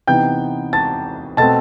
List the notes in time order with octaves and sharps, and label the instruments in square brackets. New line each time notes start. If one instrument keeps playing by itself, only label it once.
[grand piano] C3 E3 B3 D#4 G5 G6
A5 A6
B2 A3 C4 A5 A6